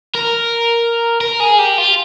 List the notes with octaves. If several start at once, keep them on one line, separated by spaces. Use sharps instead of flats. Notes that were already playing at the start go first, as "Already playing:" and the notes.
A#4
A#4
G#4
G4
F4